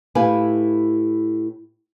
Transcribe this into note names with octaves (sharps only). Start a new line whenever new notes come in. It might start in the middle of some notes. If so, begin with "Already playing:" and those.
A2 E4 G4 B4 F5 G#5